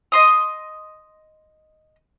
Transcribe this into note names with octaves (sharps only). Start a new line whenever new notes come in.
D#5 C6 D#6